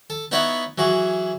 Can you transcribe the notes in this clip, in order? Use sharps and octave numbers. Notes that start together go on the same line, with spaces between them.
A4
B3 D#4 E4 B4 C#5 F#5
E3 F#3 F#4 G#4